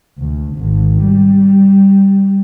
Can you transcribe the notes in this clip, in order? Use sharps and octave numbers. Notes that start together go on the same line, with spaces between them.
D2
G#1
G3